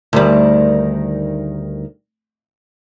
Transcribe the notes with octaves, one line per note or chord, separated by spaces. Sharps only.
D2 D#3 G3